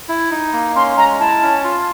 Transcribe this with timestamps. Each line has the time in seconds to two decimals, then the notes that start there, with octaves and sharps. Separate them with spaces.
0.09 E4
0.31 D#4
0.53 A#3
0.76 C#4 C6
0.97 G#3 A#5
1.19 E4 A5
1.42 C#4
1.64 F4